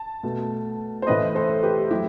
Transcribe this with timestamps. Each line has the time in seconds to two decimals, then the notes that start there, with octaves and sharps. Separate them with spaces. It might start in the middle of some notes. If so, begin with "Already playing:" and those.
Already playing: A5
0.23 B2 A3
1.02 C5
1.07 A2 E3 A3 B4 D#5
1.35 A4 C5
1.62 G4 B4
1.91 F#3 A3 E4 G4